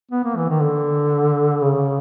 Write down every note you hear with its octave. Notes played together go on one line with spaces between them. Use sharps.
B3
A#3
E3
D#3
D3
C#3